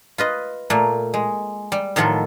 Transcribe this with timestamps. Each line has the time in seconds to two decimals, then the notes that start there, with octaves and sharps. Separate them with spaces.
0.18 F4 B4 D#5
0.70 A#2 A3 A#3
1.14 G#3
1.72 G3
1.96 A2 D#3 F3 F#3 F4 A4